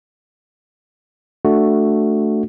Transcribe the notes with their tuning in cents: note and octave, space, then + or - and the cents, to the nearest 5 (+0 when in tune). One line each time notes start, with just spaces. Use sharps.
A3 +0 D4 +0 F#4 +0